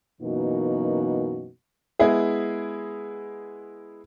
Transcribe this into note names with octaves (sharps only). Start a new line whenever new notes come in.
F#2 B2 E3 A#3 D#4 F#4
G#3 B3 E4 G#4